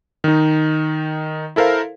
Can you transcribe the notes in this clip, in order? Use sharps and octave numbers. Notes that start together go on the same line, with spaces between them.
D#3 D#4
E4 A4 A#4 C5 F5